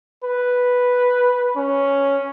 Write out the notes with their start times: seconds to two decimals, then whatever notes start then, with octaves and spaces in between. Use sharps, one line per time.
0.24 B4
1.56 C#4